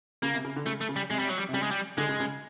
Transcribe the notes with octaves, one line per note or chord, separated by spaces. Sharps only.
C#3 A#3
C3
C#3
D3
C#3 A3
A3
C#3
G3
C3 G#3
G3
F#3
G3
C3
C#3 G3
G#3
G3
D3 G#3
C#3
C#3